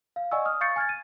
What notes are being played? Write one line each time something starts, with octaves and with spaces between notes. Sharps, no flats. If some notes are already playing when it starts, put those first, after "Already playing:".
F5
D5 D#5 F#5 G#5 C#6 E6
D#6 F6
F5 C#6 G6 A6 C7 C#7
G#5 F6 G#6 A6
D#7